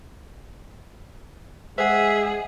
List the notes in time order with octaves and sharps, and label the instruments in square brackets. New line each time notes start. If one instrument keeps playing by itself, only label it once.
[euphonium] G#3 [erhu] G#4 [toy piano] C5 F#5 [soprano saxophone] E5